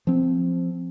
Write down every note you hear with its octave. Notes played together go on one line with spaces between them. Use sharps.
F3 C4